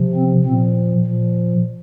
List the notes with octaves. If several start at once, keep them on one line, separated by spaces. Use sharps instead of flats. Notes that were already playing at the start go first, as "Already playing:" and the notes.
Already playing: C3 F3
C4
A#2 F3 C4
A#2 F3